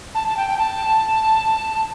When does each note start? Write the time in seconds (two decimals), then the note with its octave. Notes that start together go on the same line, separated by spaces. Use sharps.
0.14 A5
0.28 A5
0.37 G5
0.50 G5
0.58 A5